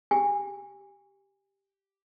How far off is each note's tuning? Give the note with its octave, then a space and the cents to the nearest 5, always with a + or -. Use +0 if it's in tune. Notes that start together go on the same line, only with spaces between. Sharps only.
G4 +0 G#5 -25